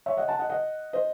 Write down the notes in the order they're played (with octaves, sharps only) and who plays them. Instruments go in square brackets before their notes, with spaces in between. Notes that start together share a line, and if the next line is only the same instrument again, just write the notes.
[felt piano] C#5 E5
D#5 F#5
F#5 A5
D#5 F#5
D#5 F#5
C5 D#5